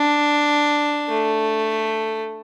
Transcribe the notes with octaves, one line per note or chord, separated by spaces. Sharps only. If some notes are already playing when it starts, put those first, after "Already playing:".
Already playing: D4
A3